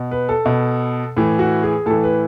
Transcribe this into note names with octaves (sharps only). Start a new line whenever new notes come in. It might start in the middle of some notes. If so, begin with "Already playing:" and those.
Already playing: B2
B4
A4
B2
A2 E3
F#4
G#4
A2 E3 A4
B4